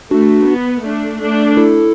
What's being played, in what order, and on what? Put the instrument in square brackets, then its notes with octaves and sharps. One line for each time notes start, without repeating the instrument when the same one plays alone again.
[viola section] A3 [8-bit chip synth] D4 F#4
[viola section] B3
A3 D4
A3 D4
[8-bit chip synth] E4 A4